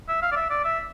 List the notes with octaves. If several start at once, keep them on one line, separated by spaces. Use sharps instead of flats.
E5
F5
D5
E5
D5
E5